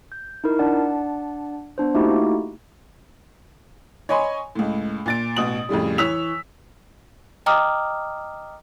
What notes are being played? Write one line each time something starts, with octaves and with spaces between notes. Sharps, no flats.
G6
D#4 E4 A#4
D4 D5 F#5 A5
B3 D4 C5
A3 A#3 D#4 E4 F#4 G4
C#5 D#5 G#5 B5 C6
C#2 A2
A#2 A6 D7
A1 B2 D#6 F#7
F2 A2 C#3 G3
E3 C#5 E6 B6 F7
D#5 G5 A#5 D6 D#6 F6